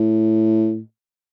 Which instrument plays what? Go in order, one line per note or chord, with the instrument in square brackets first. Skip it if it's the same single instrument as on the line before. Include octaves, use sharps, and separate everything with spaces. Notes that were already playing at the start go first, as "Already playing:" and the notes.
Already playing: [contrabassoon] A2